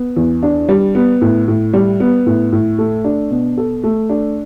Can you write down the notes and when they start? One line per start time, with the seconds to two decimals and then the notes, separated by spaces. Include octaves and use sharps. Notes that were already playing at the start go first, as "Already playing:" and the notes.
Already playing: B3
0.17 E2
0.43 D4
0.69 G3
0.95 B3
1.21 A2
1.48 A2
1.73 G3
2.00 B3
2.26 A2
2.52 A2
2.78 A3
3.04 D4
3.31 B2
3.57 A4
3.83 A3
4.09 D4